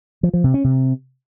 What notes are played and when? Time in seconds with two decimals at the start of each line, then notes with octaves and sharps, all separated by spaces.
0.23 F3
0.33 F3
0.44 C3
0.54 C#4
0.64 C3